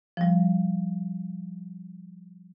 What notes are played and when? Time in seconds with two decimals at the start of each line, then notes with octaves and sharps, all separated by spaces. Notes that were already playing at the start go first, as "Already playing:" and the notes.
0.17 F3 G3